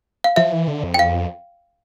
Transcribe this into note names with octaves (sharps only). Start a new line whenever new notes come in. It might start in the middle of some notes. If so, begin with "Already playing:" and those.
F5
F3 E5
E3
D3
F2
G5
F5